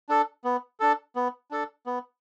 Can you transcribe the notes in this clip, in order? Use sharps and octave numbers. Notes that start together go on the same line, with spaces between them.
D4 A4
B3
D4 A4
B3
D4 A4
B3